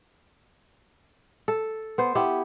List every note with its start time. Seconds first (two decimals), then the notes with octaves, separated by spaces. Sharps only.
1.48 A4
1.98 B3 C5
2.15 B3 E4 G4